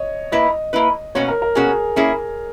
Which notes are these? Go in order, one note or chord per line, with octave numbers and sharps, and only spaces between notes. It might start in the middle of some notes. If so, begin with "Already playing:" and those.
Already playing: C#5 D#5
A#3 E4 B4 D#5
A#3 E4 B4
B2 A#3 C#4 F#4 C#5
A#4
A#4
B2 A#3 C#4 F#4 G#4
A#3 C#4 E4 G#4